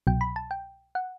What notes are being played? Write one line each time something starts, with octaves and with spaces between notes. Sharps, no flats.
C2 B2 F#3 G5
B5
A5
G5
F#5